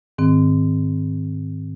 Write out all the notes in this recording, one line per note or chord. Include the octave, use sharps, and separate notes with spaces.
G#2 D#3 C4